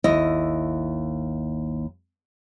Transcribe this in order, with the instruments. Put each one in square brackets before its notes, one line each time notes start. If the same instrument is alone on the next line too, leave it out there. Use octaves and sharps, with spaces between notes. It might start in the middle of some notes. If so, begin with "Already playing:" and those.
[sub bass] G#1 [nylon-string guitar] D#2 E4 D#5